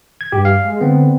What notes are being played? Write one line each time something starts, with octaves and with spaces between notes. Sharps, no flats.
G#6
G2 G4
F5
G#3
D3 B3 C4